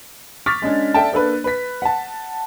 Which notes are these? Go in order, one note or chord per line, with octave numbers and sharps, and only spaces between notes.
C#6 D6 F6 A6 B6
G#3 C#4 D4
A4 D5 E5 G5 A5
A#3 D4 A4 B4
B4 B6
F#5 A5